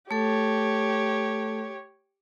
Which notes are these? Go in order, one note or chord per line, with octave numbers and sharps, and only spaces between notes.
A3 G4 A4 C#5